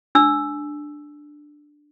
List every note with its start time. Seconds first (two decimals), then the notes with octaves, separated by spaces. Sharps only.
0.15 D4 E6